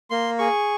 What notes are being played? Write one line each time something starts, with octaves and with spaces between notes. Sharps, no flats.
A#3 C6
G#4 C#6